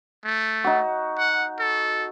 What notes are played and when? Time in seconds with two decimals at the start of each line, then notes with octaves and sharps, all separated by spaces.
0.25 A3
0.64 D#4 F#4
1.18 F#5
1.59 A4